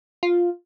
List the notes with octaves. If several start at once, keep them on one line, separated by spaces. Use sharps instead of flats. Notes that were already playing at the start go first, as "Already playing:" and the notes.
F4